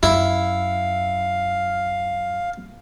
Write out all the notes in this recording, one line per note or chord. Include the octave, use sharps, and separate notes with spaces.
F#2 E4 F5